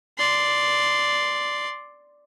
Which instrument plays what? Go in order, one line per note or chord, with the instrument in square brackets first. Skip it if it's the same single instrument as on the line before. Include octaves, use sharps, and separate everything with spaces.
[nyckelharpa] D5 C6